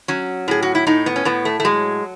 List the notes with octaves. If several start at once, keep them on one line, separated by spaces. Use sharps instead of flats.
F#3 C#4
A2 G#4
F#4
E4
A2 D#4
B3
C#4
A2 B3
A3
A3
F#3 G#3